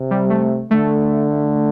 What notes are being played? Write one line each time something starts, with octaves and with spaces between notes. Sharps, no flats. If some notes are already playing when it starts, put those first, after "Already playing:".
Already playing: C3
G3
A3
D3 A3